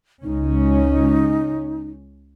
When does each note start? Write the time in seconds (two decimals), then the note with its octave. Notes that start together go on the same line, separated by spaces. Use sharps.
0.24 C#2 C#4 D#4